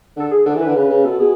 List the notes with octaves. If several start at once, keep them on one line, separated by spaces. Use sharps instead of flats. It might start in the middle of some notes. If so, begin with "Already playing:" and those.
D3 A4
G#4
D3 A4
E3
D3 B4
C#3
C#3
B2 A4
B2 G#4